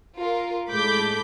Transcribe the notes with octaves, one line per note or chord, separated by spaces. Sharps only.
F4 A#4
A2 G#3 A4 B5 D6 G6